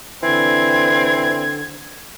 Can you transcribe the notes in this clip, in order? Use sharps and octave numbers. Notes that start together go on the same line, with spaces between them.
D3 E3 C4 G#6